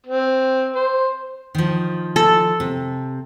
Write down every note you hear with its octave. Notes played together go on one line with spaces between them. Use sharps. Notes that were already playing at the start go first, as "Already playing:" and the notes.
C4
C5
D#3 F3
A4
C3